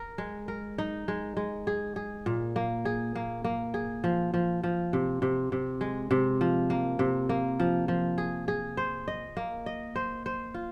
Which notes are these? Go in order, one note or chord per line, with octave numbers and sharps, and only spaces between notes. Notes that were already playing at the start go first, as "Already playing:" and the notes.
Already playing: A#4
G#3
A#4
D#4
G#3
G#3
G#4
G#4
A#2
A#3
G#4
A#3
A#3
G#4
F3
F3
F3
C3
C3
C3
G#3
C3
F3
A#3
C3
A#3
F3
F3
G#4
G#4
C5
D#5
A#3
D#5
C5
C5
F4